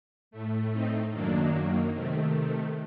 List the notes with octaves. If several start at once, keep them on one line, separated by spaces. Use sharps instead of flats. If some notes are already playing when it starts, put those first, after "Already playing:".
A2 A3
C4 D#4
F#2 D#3 F#3 A#3 D4
C3 D#3 A3 C4